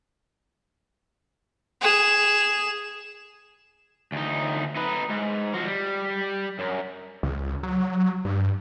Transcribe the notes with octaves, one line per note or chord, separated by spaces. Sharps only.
G#4 E7
D2 D#4
D#4 B4
G#2
F3 F#4
G3
F#2
C#2
F#3
G2